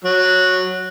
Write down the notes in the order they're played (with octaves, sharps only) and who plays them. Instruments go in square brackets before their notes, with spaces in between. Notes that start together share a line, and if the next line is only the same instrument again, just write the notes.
[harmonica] F#3